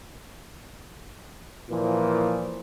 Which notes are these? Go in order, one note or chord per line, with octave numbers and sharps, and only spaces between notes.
A#2 E3 F3